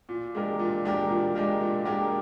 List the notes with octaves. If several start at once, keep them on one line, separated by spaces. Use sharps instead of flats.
A#2
G#3 D4 G4 A#4
A#2
G#3 D4 G4 A#4
A#2
G#3 D4 G4 A#4
A#2
G#3 D4 G4 A#4